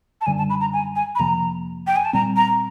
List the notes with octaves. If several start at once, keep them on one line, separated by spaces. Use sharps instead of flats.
A5
F#2 D3 G3 G#5
A5
B5
A#5
G#5
G#5
B5
F2 C3 F3 A#3 A#5
G5
G#5
A5
A#2 G3 C4 A#5
A#5